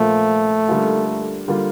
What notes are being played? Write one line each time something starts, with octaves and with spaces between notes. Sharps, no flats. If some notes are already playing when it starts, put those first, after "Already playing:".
Already playing: A#2 F3 A3 A#3 F4 C5
D3 G3 A#3 F4
D3 G3 A#3 F4